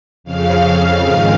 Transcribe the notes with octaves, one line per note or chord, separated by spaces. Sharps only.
F2 C#3 F5
G#2 D#3